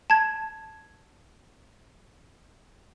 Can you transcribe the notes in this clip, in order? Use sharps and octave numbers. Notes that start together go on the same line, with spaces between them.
A5 G#6